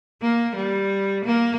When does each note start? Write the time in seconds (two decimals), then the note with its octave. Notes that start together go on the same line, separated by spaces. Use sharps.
0.22 A#3
0.55 G3
1.25 A#3